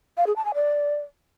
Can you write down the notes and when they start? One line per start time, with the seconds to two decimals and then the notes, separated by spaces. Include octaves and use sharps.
0.17 F5
0.27 G#4
0.36 A5
0.45 G#5
0.54 D5